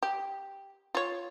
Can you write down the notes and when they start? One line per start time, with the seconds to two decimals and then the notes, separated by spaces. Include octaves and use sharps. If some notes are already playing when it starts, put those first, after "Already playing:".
0.03 G4
0.95 F4 C#5